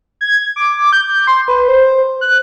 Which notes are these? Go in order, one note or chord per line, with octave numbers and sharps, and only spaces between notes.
G#6
D6
G6
C6
B4
C5
F#6